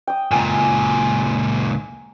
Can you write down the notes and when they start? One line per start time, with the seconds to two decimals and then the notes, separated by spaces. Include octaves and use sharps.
0.07 G5 D#6
0.31 C#2 A#2 G#5 A#5